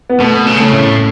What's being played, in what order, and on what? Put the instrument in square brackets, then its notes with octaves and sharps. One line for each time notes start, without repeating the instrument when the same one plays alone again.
[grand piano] B3
[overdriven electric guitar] B2 [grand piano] A3
[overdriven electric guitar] C#3
[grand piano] A3 C#4
[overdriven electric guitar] A2